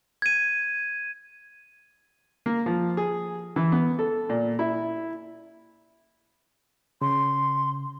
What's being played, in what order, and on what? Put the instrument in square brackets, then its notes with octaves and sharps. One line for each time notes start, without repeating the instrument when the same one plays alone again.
[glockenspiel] G#6 D#7
[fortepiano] A#3
F3
G#4
E3
B3
A4
A#2
E4
[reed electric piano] C#3 [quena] C6